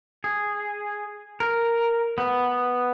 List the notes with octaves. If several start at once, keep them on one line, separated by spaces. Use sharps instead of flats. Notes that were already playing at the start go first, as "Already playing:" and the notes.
G#4
A#4
B3